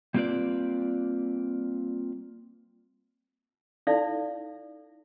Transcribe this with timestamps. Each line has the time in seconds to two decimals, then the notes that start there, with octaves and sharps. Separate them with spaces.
0.14 G3 A#3 C4 F4 B4 D5
3.87 D#4 E4 A4 D5 F5